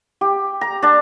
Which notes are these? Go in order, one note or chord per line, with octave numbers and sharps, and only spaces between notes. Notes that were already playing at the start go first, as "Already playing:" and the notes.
G4
A#5
D4 A5